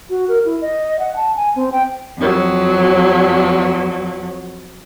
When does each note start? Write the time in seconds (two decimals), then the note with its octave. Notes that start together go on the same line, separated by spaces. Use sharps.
0.10 F#4
0.29 A#4
0.45 E4
0.61 D#5
0.99 F#5
1.16 A5
1.36 G#5
1.56 C4
1.72 G5
2.18 F2 F#3